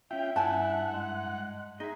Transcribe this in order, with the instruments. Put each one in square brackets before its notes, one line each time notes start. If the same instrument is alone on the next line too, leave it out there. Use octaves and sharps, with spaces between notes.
[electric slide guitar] C#4 F4 [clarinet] E5 [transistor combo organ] G5
[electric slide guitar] G2 [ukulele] E4 G#5 A5 [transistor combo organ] F#5
[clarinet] G#3
[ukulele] D#4 [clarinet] G#4 [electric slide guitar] D#5 E5